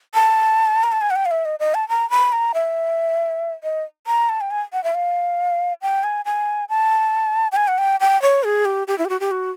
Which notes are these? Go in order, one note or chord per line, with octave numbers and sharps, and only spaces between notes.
A5
A#5
A5
G#5
F#5
G5
F5
E5
D#5
D#5
A5
A#5
B5
A#5
E5
D#5
A#5
A5
G5
G#5
F#5
E5
F5
G5
G#5
G#5
A5
G5
G#5
F#5
G5
G5
C#5
G#4
G4
G4
E4
G4
F#4
G4
F#4